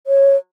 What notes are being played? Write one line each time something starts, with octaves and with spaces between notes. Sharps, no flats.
C#5